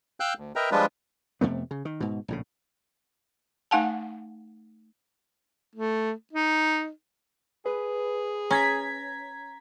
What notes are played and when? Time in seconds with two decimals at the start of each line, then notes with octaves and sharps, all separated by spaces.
0.20 F5 G5 E6 F#6 G6
0.38 D2
0.56 A#4 B4 D#5 E5 G5 A#5
0.71 F3 G3 G#3 D4 F4 B4
1.41 F2 C3 A3 B3
1.71 C#3
1.85 D#3
2.00 G#2 B2
2.28 A#1 A2 C#3
3.71 A3 D#4 F5 F#5 G#5 A5
5.75 A3
6.33 D#4
7.66 G#4 B4
8.51 C#4 A#5 G#6 B6